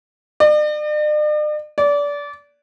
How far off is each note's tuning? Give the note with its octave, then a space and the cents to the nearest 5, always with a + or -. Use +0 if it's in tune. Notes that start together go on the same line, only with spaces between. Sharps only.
D5 +45
D5 -25